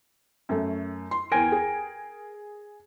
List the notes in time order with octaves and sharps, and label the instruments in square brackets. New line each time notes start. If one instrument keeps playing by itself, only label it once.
[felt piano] F#2 A3
C6
[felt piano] E2 A#6 [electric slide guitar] A#4 G5 G#5
[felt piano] G#4